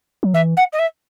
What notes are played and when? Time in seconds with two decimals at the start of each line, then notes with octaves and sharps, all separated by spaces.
0.23 F#3
0.34 E3 E5
0.57 F#5
0.73 D#5
0.79 E5